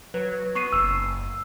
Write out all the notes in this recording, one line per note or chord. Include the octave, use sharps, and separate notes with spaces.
F#3 B4
B3 C#6 C7 D#7
F#1 E6